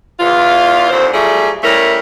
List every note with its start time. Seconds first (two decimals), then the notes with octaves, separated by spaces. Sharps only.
0.20 E2 F4
0.90 D#2 D3 C4 C5
1.13 F#3 G3 A3 F4 G#4
1.63 G3 A3 C#4 E4 A#4